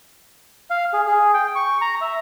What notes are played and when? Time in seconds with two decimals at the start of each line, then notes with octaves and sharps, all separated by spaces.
0.70 F5
0.93 G#4
1.07 G#4
1.34 G5
1.55 C#6
1.81 A#5
2.01 E5